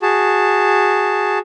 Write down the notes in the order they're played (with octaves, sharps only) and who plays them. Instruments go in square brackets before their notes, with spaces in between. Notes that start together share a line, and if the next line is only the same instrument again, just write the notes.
[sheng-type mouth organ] F#4 G#4 A5